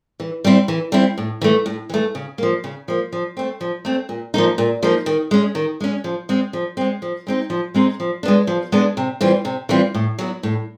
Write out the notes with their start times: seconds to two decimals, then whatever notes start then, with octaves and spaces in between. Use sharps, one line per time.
0.20 E3
0.45 G3 C4 E4
0.68 E3
0.92 G3 C4 E4
1.18 A2
1.41 E3 A3
1.66 A2
1.89 E3 A3
2.15 C#3
2.38 F3 A#3
2.64 C#3
2.88 F3 A#3
3.12 F3
3.37 A3 C4
3.61 F3
3.85 A3 C4
4.09 A#2
4.34 F3 A#3 D#4
4.58 A#2
4.83 F3 A#3 D#4
5.06 D#3
5.31 G#3 C#4
5.55 D#3
5.80 G#3 C#4
6.04 F3
6.29 G#3 C4
6.53 F3
6.77 G#3 C4
7.02 F3
7.27 G#3 C4 D#4
7.50 F3
7.74 G#3 C4 D#4
8.00 F3
8.23 G#3 B3 D4
8.47 F3
8.72 G#3 B3 D4
8.97 C3
9.21 E3 G3 C4 F4
9.45 C3
9.69 E3 G3 C4 F4
9.95 A2
10.19 F#3 B3 E4
10.43 A2